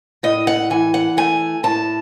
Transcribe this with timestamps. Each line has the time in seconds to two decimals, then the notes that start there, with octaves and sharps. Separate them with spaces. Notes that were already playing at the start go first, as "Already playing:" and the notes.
0.23 A2 D#5
0.47 F#5
0.70 E3 G#5
0.94 F#5
1.17 A3 G#5
1.63 A2 A5